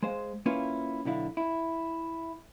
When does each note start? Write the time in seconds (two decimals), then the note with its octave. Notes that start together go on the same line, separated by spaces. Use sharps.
0.03 G#3 C5 F5
0.46 A#3 C#4 E4 F4 B4
1.05 B1 D3 E4 F5
1.37 E4